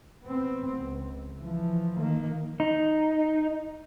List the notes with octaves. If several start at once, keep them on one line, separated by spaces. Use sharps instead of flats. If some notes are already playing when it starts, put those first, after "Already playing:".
B3 C4
C#2
E3 F3
D#3 A#3
D#4